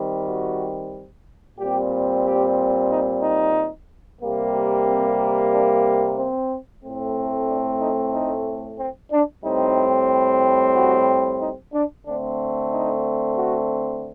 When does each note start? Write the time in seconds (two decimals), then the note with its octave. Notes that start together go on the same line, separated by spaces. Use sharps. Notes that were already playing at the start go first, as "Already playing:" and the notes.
Already playing: D#3 G3 C4
0.28 F#4
1.59 A#2 G3 C4 G4
2.25 G4
2.90 D#4
3.23 D#4
4.21 C3 G3 A#3
4.87 C4
5.51 D4
6.17 C4
6.83 A2 A3 C4
7.48 D4
7.81 D#4
8.13 D#4
8.79 C4
9.12 D4
9.44 A2 G3 C4 D#4
10.76 F#4
11.41 D#4
11.73 D4
12.05 D3 A3 C4 D4
12.72 D#4
13.37 F#4